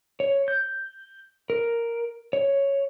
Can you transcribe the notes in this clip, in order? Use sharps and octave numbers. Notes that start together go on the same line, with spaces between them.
C#5
G6
A#4
C#5